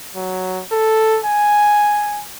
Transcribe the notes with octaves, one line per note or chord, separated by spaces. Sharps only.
F#3
A4
G#5